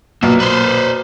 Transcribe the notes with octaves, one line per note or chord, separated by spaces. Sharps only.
B1 A#2 A#3
B4 C5